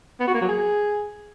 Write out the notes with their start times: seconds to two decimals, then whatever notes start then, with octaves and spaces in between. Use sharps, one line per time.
0.20 B3
0.27 F#4
0.34 A#3
0.41 F#3
0.48 G#4